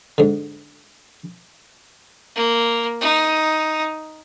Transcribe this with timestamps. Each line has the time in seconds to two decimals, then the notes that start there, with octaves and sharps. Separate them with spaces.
0.18 G#2 D3
2.35 A#3
3.01 D#4